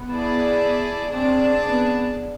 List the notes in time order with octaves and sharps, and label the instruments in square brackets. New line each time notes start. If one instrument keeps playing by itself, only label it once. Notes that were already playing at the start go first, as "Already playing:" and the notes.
Already playing: [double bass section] B3
[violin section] E4 G#4 D5 A5
[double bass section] C4 [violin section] D4 G#4 D5 A5
[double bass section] B3